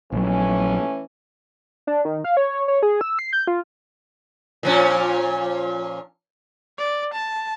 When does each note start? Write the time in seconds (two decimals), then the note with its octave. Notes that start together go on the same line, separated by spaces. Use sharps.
0.12 A#1 E3 F#3 A3 C#4
1.87 D4
2.05 D#3
2.24 F5
2.37 C#5
2.68 C#5
2.83 G#4
3.01 E6
3.19 C7
3.33 G6
3.47 F4
4.63 A#2 F3 C#4
6.78 D5
7.14 A5